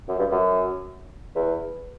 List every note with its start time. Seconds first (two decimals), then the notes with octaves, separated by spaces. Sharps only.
0.08 F#2
0.19 G2
0.31 F#2
1.36 E2